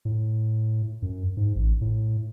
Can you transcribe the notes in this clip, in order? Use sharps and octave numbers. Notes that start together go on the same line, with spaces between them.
A2
F#2
G#2
A1
A2